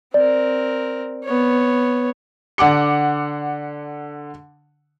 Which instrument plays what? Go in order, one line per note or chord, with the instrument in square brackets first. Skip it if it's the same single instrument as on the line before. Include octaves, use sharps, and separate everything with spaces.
[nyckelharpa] C4 A#4 [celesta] D5
[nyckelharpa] B3 C#5
[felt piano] D3 F#5 D6 C#7